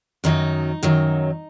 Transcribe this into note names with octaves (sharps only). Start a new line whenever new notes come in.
F#2 D#3 F#3 D#4
F#2 D#3 F#3